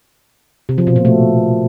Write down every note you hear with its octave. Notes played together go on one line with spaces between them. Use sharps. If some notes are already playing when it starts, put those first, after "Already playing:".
C3
F3
B2
A#2
A3